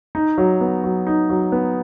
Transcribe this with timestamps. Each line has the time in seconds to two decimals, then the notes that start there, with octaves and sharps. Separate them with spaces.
0.15 D#4
0.38 F#3
0.61 B3
0.84 F#3
1.07 D#4
1.30 F#3
1.52 B3